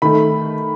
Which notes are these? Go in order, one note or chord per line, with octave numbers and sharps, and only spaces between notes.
D#3 A3 B5